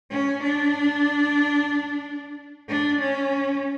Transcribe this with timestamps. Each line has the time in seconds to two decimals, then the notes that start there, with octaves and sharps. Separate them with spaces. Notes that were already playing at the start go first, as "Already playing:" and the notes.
0.11 C#4
0.43 D4
2.69 D4
3.01 C#4